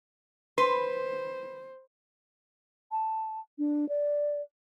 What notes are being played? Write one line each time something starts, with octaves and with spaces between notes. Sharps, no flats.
B4 C5 C6
A5
D4
D5